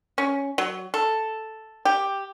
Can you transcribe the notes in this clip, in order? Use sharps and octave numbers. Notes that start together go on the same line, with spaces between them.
C#4
F#3
A4
G4